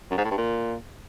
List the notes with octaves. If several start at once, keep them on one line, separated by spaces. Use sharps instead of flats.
F#2
G#2
A2
G2
A#2